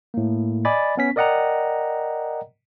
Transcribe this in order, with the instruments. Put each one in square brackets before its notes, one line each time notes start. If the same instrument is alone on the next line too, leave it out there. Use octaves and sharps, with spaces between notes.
[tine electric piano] A2 A#3
D5 D#5 G#5 B5 A6
B3 C#4 B6
A#4 D5 D#5 F#5 G5 A#5